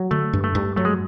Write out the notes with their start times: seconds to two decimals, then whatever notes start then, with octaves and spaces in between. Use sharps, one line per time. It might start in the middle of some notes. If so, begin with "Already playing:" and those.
Already playing: F#3
0.11 D3 A3
0.33 G2
0.44 A3
0.55 G2
0.76 F#3 A3
0.85 G#3